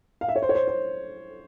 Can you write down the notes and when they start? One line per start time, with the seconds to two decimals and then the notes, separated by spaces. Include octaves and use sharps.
0.21 F5
0.28 E5
0.36 C#5
0.42 C5
0.49 C#5
0.55 C5
0.68 C5